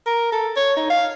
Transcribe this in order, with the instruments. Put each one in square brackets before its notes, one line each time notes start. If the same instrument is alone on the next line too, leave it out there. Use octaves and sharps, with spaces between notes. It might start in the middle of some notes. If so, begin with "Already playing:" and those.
[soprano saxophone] A#4
A4
C#5
D#4
F5